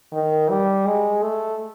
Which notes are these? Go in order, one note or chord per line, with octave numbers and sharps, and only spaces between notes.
D#3
G3
G#3
A3